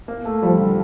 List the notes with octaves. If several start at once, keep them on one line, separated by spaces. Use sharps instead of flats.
A#3
A3
F3 G3
D3